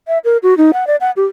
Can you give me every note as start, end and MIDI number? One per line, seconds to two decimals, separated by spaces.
0.08 0.18 76
0.25 0.37 70
0.43 0.56 66
0.57 0.71 63
0.73 0.87 78
0.87 0.96 74
1.01 1.11 78
1.16 1.25 67